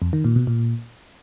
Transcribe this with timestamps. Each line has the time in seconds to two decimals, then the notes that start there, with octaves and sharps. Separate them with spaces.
0.02 F2
0.13 D#3
0.24 A#2
0.36 B2
0.47 A#2